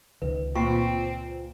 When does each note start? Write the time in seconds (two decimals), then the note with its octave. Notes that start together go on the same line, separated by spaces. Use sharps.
0.22 C#2 D#3 B4
0.55 A#2 C4 F4 C5 G5 C#6